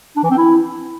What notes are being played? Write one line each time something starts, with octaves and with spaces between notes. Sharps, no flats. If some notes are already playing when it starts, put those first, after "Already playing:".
D4
E3
C4
E4